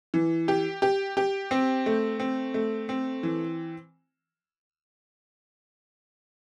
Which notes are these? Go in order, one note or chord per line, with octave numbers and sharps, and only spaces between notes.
E3
G4
G4
G4
C4
A3
C4
A3
C4
E3